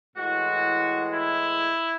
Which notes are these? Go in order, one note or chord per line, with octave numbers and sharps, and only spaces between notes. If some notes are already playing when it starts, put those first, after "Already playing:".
A2 E3 G#3 F#4
E4